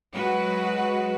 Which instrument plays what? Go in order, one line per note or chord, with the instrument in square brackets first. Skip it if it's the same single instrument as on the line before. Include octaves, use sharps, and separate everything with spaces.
[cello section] F#3 G#3 F#4 B4